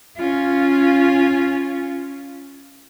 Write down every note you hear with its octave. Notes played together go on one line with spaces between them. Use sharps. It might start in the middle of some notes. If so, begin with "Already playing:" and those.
C#4 F4